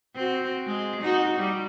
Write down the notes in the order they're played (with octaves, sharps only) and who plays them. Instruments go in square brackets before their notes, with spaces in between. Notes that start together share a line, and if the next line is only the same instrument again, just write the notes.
[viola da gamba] C4 F#4
G#3
D#4 F#4
G3